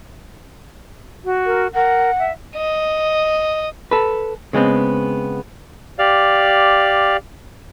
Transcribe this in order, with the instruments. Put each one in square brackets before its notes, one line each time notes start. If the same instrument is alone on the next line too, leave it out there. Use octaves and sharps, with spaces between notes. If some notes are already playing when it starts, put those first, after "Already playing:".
[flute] F#4
[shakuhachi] A#4
[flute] A#4 [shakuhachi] F#5
[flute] E5
[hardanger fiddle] D#5
[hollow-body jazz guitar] A4 B4
C#3 G#3 B3 C4
[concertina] G4 D5 F5